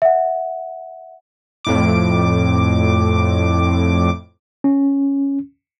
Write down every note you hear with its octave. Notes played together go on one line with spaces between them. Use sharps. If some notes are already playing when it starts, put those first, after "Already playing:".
E5 F#5
F2 A2 D6
C#4